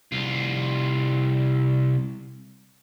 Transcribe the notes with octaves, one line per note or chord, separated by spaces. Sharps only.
C2 F4